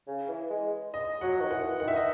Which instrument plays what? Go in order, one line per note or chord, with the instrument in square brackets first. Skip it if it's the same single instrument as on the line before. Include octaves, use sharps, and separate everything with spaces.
[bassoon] C#3
E3
G#3
[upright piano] D#5
[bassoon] F#3 [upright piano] F#5
[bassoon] D#3
[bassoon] E3 [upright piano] F#5
[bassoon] D#3 [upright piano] F#5
[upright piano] E5
D#5